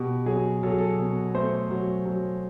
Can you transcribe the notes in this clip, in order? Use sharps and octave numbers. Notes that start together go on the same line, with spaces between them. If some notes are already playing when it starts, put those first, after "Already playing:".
Already playing: B2 G4
F#3 G#4
F#3 A4
G#4
A4
B2
A3 C5
F#3
F#3